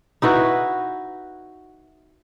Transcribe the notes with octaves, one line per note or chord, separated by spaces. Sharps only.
D#4 E4 F#4 B4